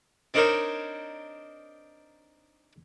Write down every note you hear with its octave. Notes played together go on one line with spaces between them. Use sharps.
C4 D4 D#4 A#4 C5 C#5